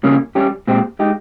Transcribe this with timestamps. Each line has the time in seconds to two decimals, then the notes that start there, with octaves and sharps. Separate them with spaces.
0.04 C#3 G3 A#3 C#4
0.35 G3 C#4 G4
0.67 A#2 G#3 C4 G4
0.99 G#3 D#4 G4